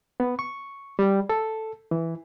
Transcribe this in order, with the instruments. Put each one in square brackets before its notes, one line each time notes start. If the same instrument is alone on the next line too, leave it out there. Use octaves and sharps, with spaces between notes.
[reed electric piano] B3
C#6
G3
A4
E3